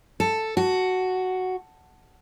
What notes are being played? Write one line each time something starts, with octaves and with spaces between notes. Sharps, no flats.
A4
F#4